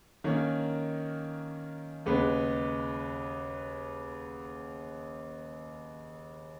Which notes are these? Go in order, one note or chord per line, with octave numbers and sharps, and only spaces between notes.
D#3 A#3 C#4
D#2 C#3 G#3 B3